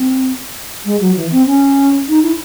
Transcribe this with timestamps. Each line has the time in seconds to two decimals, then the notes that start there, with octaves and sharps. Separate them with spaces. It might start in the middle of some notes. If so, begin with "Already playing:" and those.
Already playing: C4
0.85 G#3
1.01 F#3
1.17 E3
1.32 C4
1.47 C#4
2.09 D#4
2.23 E4